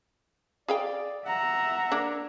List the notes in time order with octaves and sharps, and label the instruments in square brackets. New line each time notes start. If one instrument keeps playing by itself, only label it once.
[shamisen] G#4 F5 G5 [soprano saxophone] D5
[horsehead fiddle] E5 A#5 [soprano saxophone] F#5
[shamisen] A#3 D4